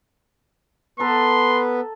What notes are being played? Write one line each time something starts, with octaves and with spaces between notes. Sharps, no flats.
B3 A4 B4 A#5 C6